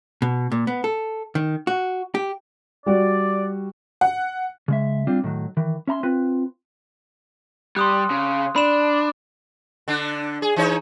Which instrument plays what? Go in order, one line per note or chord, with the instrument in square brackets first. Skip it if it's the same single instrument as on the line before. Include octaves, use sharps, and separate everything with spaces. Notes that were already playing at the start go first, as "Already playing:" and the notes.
[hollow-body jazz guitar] B2
A#2
B3
A4
D#3
F#4
G4
[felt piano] G3 F#4 [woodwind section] D5
[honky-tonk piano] F#5
[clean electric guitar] C#3 G#3 E5
G3 C4 D4 F4
A2 D#3 F#3
D#3 E3
C#4 E5 A#5 C6
C4 F4 B4
[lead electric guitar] G3 [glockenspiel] C6 D#6 F#6
[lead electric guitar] C#3
[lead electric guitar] D4 [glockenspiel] B5 E7
[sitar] D3 D4
G#4
E3 D#4 C#5